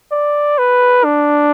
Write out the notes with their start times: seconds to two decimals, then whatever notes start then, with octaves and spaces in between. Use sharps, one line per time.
0.12 D5
0.58 B4
1.04 D4